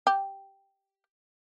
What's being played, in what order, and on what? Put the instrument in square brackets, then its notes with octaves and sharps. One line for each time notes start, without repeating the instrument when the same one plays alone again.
[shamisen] G4